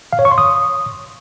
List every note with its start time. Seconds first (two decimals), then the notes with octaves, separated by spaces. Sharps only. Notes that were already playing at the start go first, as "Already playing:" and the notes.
0.13 F5
0.19 C#5
0.25 C#6
0.31 C6
0.38 D#6